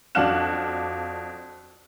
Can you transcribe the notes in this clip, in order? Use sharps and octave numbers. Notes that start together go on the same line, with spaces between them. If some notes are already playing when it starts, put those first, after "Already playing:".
F2 D4 F#4 F5 F#6 E7